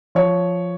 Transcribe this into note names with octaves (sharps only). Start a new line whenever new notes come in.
F3 C#5